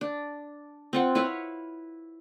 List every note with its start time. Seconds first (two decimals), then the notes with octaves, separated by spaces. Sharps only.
0.01 D4
0.93 C4 F4 F#5
1.15 E4 B4 C#5 F5